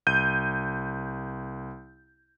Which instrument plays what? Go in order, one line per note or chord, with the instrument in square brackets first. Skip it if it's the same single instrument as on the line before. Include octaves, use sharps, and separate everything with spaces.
[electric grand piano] C2 G6 D#7